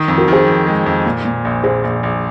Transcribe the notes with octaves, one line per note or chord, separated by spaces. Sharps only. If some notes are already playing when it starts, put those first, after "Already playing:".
Already playing: D#3
F2
F#4 A#4
D#3 G#4 C5
F2
G#3
F2
A#2
A#2
A#1
A#1 G#4 C5
A#1
A#1